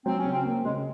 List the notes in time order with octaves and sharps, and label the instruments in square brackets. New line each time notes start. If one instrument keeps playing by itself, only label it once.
[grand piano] F#3 [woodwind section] C4
[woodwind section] C#4
[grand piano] C#3
[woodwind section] C4
[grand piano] A#3
[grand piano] C#3 [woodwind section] G#3